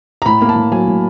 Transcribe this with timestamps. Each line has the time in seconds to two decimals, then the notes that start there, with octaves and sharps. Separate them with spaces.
0.22 A#5
0.26 A2 B5
0.42 A#3
0.49 A5
0.56 A2
0.72 F#3 G#5
0.87 A2